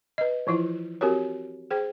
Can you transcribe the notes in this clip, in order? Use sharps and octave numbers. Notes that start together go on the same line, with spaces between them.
B4 D#5
E3 F3 E4 F4
C4 F#4 G4 A#4 C#5
G#4 C5 G5